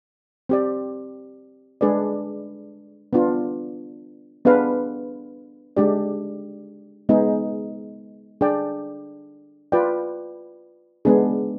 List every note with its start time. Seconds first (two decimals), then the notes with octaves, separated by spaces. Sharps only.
0.49 C4 G4 D5
1.81 G#3 D4 G#4 B4 D5
3.13 B3 D4 F4
4.45 B3 D4 G#4 B4 F5
5.77 G#3 D4 G4 D5
7.09 G#3 B3 D#4 G#4
8.41 D4 G#4 D5 G5
9.72 F4 B4 D5 G5
11.05 G#3 B3 D4 G#4